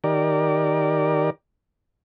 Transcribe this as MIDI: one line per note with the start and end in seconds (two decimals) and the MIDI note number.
0.04 1.30 51
0.04 1.30 67
0.04 1.30 70
0.04 1.30 74